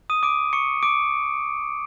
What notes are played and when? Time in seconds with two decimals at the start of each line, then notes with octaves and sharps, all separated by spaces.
0.10 D#6 D#7
0.23 D6 D7
0.53 C#6 C#7
0.83 D6 D7